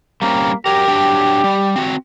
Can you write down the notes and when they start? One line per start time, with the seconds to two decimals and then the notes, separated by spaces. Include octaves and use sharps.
0.22 G3 A#3 C4 C#4
0.66 F#3 G4 A#4
0.88 F#3 D4 G5
1.44 G3
1.76 C4 F#4